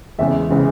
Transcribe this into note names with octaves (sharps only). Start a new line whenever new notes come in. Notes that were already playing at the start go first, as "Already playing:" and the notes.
E2 C#3 E3 G#3 E5
C#3 E3 G#3